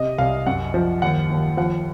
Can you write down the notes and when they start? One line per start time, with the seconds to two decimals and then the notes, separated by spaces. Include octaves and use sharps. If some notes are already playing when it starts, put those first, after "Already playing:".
Already playing: C3 D#5
0.18 C2 F5
0.47 F#2 F#5
0.74 F3
1.02 D#2 F#5
1.30 D#2
1.57 F3 F#5